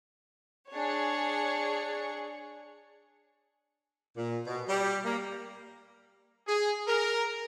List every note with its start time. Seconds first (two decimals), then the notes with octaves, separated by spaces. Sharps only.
0.72 D4 G#4 C#5 C#7
4.16 A#2
4.46 B2
4.68 G3
5.04 A#3
6.48 G#4
6.87 A#4